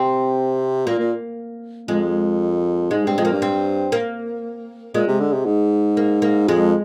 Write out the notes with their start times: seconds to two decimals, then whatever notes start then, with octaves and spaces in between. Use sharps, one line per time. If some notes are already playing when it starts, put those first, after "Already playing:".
Already playing: C3 C4
0.87 A#2 A#3
0.99 A#2
1.88 F2 G#3
2.91 G#2 G#3
3.05 G2 C4
3.18 F2 G#3
3.25 A#3
3.32 G2
3.42 C4
3.92 A#3
4.94 A#2 G#3
5.07 C3
5.21 D3
5.33 C3
5.46 G#2
5.97 A#3
6.22 A#3
6.48 F2 G#3